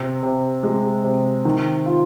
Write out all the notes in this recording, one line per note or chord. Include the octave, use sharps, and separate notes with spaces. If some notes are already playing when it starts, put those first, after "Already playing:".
Already playing: C3
C3
G#3
C3
D#3
F4